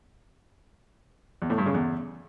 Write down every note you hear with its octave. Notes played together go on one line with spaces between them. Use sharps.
E2
A2
G2
C#3
E2